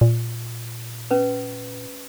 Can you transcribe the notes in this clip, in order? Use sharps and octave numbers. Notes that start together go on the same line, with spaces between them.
A#2
C#4 B4